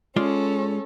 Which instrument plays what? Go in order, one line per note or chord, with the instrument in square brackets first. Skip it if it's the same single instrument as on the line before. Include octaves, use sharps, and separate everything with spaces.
[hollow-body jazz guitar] G#3 F4 D5 [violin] C#4 A4